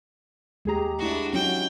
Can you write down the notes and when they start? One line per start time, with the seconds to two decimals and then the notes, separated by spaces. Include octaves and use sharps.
0.65 D#2 G#3 G4 G#4 A#5
0.99 A3 D4 E4 F#4
1.33 F#3 C#4 D#4 F#4 G5